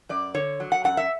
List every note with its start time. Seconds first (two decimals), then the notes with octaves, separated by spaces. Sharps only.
0.09 F#2 D5
0.34 D3 C#5
0.60 F#3
0.72 F#5
0.84 F#2 F#5
0.97 E5